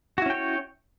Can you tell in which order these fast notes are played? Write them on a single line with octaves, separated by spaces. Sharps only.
F#4 E4 C#4 G5 C#5